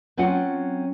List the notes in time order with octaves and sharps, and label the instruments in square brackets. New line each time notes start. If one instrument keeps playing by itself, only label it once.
[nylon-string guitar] F#3 C4 C#4 F4 F#5